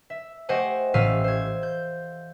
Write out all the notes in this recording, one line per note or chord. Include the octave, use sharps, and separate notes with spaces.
E5
A3 G4 C5 D#5 F#5 G#5
A1 A2 F5 E6 B6 D#7
C5 G#6
G6